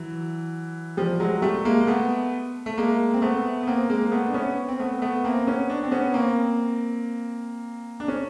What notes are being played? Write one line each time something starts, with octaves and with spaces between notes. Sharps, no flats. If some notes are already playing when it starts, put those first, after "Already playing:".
Already playing: E3 F#3
F3 G3
F#3 G#3
G3 A3
G#3 A#3
A#3
A3 B3
A3
G#3 A#3
C4
A3 B3
B3
A#3 C4
G#3 A#3
A3 B3
D4
B3 C#4
C4
A3 B3
A3 B3
A#3 C4
B3 C#4
D4
C4 D4
B3 C#4
A#3 C4
D4
C#4